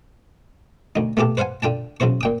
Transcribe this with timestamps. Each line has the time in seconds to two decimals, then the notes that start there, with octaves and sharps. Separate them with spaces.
0.96 D2 D#4
1.17 A3 B3 F4 G4 A4
1.37 B4 C5 F5 F#5 G#5
1.62 D3 F4 G5 A5
2.00 C#3 F#3 E4 C5 C#6
2.21 A#2 G5 D#6